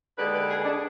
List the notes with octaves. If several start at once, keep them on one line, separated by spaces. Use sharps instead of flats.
D#2 D3 G#3 B4
B4
G#4
D4